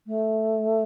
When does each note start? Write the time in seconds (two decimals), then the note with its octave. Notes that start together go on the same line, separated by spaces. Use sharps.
0.06 A3